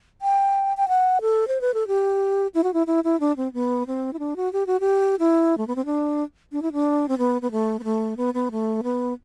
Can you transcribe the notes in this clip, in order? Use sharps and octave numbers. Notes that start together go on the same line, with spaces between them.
G5
G5
F#5
A4
C5
B4
A4
G4
E4
F#4
E4
E4
E4
D4
C4
B3
C4
E4
D4
F#4
G4
F#4
G4
E4
A3
B3
C4
D4
D4
E4
D4
C4
B3
B3
A3
B3
A3
B3
B3
A3
B3